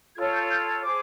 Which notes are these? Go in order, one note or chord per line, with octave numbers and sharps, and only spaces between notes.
F4 A4 C#5 G#6
G6
G6
G#6
G#4 C5 D6